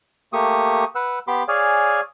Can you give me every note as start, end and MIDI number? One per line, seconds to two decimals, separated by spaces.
0.33 0.85 57
0.33 0.85 58
0.33 0.85 67
0.33 0.85 85
0.33 0.85 87
0.95 1.19 71
0.95 1.19 78
0.95 1.19 88
1.28 1.43 59
1.28 1.43 67
1.28 1.43 83
1.28 1.43 84
1.28 1.43 86
1.48 2.01 68
1.48 2.01 73
1.48 2.01 74
1.48 2.01 77
1.48 2.01 80